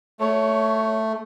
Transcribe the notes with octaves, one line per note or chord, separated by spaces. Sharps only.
A3 C#5